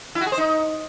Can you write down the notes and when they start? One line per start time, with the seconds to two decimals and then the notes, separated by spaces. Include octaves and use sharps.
0.15 E4
0.21 F#4
0.26 G#4
0.32 C5
0.38 D#4